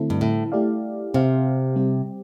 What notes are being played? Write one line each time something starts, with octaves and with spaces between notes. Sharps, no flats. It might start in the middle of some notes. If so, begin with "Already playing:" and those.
Already playing: D3 A3 C4 E4 A4
G2
A2
A3 E4 G4 D5 F5
C3 C4 G4 C5 F5
G3 C4 G4